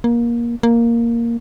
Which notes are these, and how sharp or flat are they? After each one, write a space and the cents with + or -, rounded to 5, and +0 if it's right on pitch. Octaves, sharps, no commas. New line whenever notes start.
A#3 +20
A#3 +0